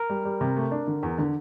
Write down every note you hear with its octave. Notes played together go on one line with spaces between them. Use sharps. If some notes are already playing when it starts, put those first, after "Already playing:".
Already playing: A#4
G3
G3
C3
A3
D4
D3
E2
D3